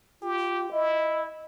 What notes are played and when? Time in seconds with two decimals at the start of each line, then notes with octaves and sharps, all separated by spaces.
0.22 F4 G4
0.72 E4 D#5